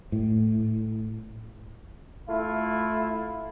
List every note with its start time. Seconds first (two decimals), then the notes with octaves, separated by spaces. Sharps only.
0.12 A2
2.28 A3 E4 F4